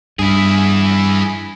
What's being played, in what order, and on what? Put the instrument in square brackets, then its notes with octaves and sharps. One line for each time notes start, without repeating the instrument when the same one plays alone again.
[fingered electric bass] G2 [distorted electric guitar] E4 G#4